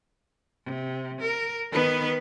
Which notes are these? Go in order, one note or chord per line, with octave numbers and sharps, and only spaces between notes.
C3
A#4
D#3 B3 B4